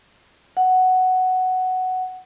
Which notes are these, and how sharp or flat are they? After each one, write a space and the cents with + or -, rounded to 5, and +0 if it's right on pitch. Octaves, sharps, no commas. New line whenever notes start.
F#5 +5